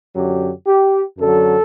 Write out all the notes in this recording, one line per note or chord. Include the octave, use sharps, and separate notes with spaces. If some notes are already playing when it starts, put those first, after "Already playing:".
F#2 D3 F#3 G4
G4
F#2 D3 F#3 A4